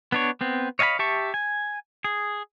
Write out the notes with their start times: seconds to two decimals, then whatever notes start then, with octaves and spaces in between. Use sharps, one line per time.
0.12 B3 D4 C#5
0.41 B3 C4
0.79 C#5 D#5 F5 G#5 B5
0.99 G4 E5 A5 C#6
1.34 G#5
2.04 G#4